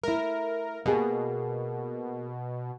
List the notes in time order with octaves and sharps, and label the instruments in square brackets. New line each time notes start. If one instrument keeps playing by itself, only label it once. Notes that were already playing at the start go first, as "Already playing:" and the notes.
[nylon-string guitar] A3 E4 [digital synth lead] A#4
[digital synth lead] B2 [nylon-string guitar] A#3 G4 G#4